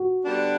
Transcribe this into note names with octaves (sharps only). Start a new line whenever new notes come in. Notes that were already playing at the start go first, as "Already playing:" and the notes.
Already playing: F#4
D3 G3 B3 D4